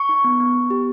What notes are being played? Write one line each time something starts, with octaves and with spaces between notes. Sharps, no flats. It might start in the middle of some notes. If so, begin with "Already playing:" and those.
Already playing: C#6
D#4
B3
B3
B3
G4